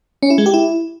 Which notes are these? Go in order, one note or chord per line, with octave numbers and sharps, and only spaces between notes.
C#4
E4
G#3
G4
E4